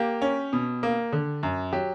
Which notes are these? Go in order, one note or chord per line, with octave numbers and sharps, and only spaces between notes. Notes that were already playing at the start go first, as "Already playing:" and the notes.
Already playing: A#3 G4
C#4
B2
A#3
D3
F#2
F#3 G4